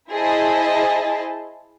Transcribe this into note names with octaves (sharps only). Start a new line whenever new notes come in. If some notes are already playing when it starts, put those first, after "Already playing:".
E4 G#4 C5 D#5 A5